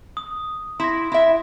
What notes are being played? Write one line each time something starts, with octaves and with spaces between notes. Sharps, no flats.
D#6
E4 C6 A#6
E4 E5